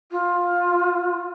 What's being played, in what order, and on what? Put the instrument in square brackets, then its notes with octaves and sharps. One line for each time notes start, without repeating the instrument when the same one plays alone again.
[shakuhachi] F4